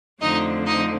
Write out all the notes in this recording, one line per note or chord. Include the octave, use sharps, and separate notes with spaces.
F2 D3 F3 A3 C4 D#4 D#5
D#4 D#5